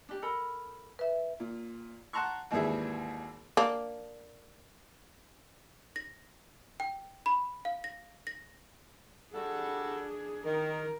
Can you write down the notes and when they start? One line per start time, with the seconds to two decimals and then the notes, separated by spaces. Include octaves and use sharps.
0.09 D4 G4
0.22 A4 A#4 B5
0.99 B4 E5
1.40 A#2
2.13 F#5 A5 A#5 C6 C#6
2.51 G#1 D#2 E3 G3 G#4 E5
3.57 A#3 D4
5.96 A#6
6.80 G5
7.26 B5
7.65 F5
7.84 A#6
8.27 A#6
9.34 G3 D4 F#4 G#4 A4
10.45 D#3 A#4